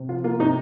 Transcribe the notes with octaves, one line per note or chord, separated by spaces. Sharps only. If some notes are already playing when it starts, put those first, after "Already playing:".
Already playing: C3
F3 F4
A#3 F4
C3 D#4